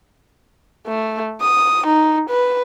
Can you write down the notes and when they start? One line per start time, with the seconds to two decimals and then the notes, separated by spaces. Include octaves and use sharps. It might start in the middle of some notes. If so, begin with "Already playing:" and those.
0.87 A3
1.41 D#6
1.87 D#4
2.30 B4